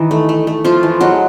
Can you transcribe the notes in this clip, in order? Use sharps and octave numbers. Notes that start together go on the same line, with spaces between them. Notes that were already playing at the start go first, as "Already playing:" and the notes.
Already playing: D#3 E3 D#4
A3
A3
A3
F3 A3 F4
E3
F#3 G#3 F#4